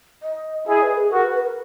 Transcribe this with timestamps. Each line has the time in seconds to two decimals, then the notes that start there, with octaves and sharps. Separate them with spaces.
0.23 D#5
0.67 E4 G#4 D#5
0.83 B4
0.97 G#4
1.12 F#4 A#4
1.24 B4
1.35 B4
1.46 A#4